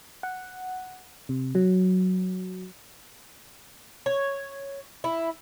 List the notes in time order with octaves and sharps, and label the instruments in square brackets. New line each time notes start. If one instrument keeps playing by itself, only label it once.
[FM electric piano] F#5
C3
F#3
[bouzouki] C#5
E4